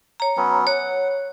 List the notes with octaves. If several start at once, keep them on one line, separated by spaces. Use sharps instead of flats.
C#5 A#5
F#3 B3 C#4
C#5 F#5